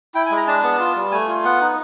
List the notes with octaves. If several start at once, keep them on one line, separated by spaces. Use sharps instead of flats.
E4 G5
G#5
G#3
A#5
D4 A5
B3
F4
G3
A3 G#5
F4
B3 F#5
D#4